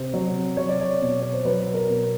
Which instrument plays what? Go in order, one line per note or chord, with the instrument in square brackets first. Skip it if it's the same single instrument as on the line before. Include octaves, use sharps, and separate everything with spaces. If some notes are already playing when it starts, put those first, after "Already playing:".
Already playing: [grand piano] C3 C5
F#3
F#3 C#5
D5
C#5
B2
C#5
C5
F#3 B4
A#4
B2